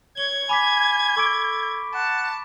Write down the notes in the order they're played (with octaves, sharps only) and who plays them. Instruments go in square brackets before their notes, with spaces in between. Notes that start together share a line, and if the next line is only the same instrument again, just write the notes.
[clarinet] C#5 [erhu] G#6 [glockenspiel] G7
[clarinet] G#5 [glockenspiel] B5 D6 B6
[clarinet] A4 [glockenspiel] C#6 D6 D7
[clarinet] F#5 [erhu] A5